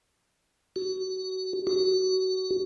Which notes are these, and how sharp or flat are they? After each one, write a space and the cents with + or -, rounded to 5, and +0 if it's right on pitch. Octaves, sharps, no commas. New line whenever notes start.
F#4 +25
F#4 +25